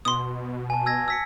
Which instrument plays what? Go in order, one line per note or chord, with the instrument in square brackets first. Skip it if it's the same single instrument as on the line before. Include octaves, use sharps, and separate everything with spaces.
[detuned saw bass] B2 [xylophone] C6 D#6
[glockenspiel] G#5 A5
E6 G#6 A#6
E6 B6 C#7